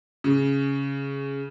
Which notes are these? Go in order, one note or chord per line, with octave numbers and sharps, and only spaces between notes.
C#3